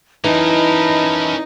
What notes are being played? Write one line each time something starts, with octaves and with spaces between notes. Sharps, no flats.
E3 C#4 D#4 A#4 D#5 A5 B5